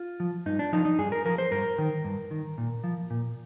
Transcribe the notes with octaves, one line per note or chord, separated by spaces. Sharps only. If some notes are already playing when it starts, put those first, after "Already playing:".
Already playing: F4
F3
G2 D#4
D4
F3 D#4
D#4
G2 G#4
A#4
F3 A#4
C5
G2 A#4
D#3
G2
D#3
A#2
F3
A#2